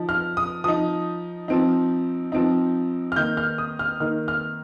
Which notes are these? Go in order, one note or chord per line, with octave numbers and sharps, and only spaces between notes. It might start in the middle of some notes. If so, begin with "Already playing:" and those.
Already playing: F3 D#4
F6
D#6
F3 D#4 D#6
F3 C4 D#4
F3 C4 D#4
F6
D#3 A#3 D#4 G6
F6
D#6
F6
D#3 A#3 D#4 F6
F6